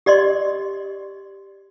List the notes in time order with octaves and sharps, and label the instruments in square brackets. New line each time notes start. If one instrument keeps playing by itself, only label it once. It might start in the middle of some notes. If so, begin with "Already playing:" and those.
[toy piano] G4 D5 D#5 C6